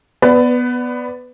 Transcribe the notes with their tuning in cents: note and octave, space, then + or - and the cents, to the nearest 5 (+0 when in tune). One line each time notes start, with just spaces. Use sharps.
B3 +0 B4 +20 D5 +0